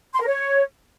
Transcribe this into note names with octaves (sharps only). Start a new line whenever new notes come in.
C6
A#4
C#5